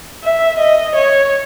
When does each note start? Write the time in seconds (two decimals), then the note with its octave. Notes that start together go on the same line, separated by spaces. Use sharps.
0.23 E5
0.59 D#5
0.95 C#5